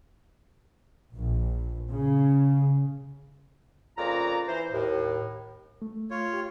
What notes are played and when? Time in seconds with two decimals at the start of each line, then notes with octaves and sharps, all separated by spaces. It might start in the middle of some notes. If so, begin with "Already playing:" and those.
1.15 A#1
1.92 C#3
3.97 F2 C#3 A#3 F4 D5 A#5
4.48 E3 C5
4.72 D#2 A2
5.82 A3
6.11 F4 C#5
6.33 G4